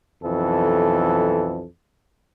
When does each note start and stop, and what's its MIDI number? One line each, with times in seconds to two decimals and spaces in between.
0.23 1.65 35
0.23 1.65 41
0.23 1.65 52
0.23 1.65 69